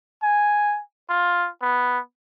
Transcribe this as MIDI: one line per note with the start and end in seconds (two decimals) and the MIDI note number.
0.23 0.80 80
1.10 1.48 65
1.62 1.99 59